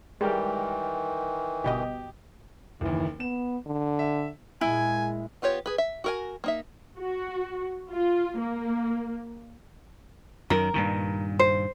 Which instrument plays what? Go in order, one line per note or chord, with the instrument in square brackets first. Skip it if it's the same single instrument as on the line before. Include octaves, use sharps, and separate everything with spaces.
[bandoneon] D#3 E3 [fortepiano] G3 G4 A#4 [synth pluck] G#3
[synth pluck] G1 B2 D#5 [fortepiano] G4
[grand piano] F#1 D#2 [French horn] E3
[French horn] B3 [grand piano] E7
[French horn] D3
[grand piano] E5
[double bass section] A#2 G#3 [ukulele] E4 [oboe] G#5
[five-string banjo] B3 F4 G4 C#5
G#4 B4
E5
F#4 A#4 G#5
A#3 D#4 E5
[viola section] F#4
F4
A#3
[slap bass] F#2 D#3 [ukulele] A#4
[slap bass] G2 A#2 D#3
[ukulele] C5